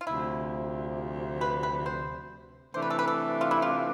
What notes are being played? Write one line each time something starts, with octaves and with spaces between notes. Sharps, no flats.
F4
D2 C3 F3 E4
B4
B4
C5
C3 E3 A3 D4 C5
B4
A4
B4
A4
F4
E4
F4